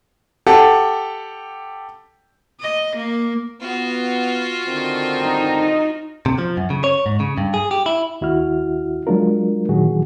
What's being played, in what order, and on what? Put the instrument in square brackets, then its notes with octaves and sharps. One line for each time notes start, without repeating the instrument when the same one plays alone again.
[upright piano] G4 A4 F#5
[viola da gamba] D#5
A#3
[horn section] B3 [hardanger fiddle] F4 F#4
[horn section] D3 D#3 C4
[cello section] D#4
[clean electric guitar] C3
F3
F#2
C#3
C#5
G#2
C#3
G2
G#4
G4
E4
[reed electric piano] D#2 E4 F#4 F6
F#3 G#3 D4 F4 A#4
A#2 D#3 E3 F#3 F#4 G#4